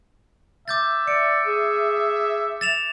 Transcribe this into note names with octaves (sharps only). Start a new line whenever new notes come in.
E5 D6 G6 A6
D5 C#7
G#4
A6 E7 F7